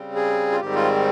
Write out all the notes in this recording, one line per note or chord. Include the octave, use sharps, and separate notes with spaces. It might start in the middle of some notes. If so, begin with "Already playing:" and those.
Already playing: C#3 G3 C4
G#4
F4
G#2 D#3 G3 C4 G4
F4